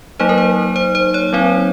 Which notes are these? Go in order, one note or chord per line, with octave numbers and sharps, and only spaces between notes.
F#3 A#3 D#4 C5
A#4
C5
C5
C5
C#5
F#3 C4 D#4